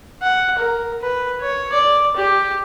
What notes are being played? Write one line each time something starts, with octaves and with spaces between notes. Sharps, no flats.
F#5
A#4
B4
C#5
D5
G4